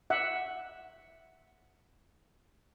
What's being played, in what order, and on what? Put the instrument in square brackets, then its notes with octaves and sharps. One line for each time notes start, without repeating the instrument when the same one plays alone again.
[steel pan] E5 F#5